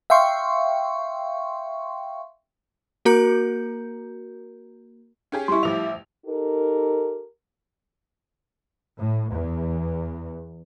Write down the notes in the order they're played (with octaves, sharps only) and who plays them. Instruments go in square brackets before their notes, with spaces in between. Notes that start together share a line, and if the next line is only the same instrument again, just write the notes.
[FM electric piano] E5 F5 G5 C6 C#6
[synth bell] A#3 F#4 A#4 A#5 G6 C#7
[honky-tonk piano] C#4 G4 G#4
[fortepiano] G3 E4 [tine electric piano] C6 C#6
[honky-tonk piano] A1 F3 F7 [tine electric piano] E5 D6
[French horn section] D#4 G4 A4 A#4
[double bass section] A2
E2